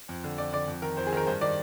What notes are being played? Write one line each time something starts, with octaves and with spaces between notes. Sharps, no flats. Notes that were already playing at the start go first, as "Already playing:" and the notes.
F2
D3
F2 D5
D3 D5
F2
D#3 A#4
F2 C5
G#4
D#3 A#4
G2 C5
D#3 D5